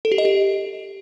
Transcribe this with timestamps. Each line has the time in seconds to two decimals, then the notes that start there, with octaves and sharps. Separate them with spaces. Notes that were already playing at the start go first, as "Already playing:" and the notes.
0.05 A4
0.12 G4
0.18 D#5
0.25 G4